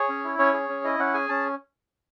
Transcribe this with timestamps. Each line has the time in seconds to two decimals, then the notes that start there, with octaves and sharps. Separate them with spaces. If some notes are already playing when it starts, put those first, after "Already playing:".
Already playing: G#4 C#5
0.09 C#4
0.24 E4
0.39 C#4 C#5
0.54 G#4
0.69 C#4
0.84 E4 D#5
0.99 C#4 F#5
1.14 G#4 G#5
1.29 C#4 A5